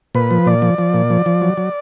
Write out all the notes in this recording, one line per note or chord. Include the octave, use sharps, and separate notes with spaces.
A#2 B4
F3
A#2 D5
F3
F3
A#2
F3
F3
F#3
F#3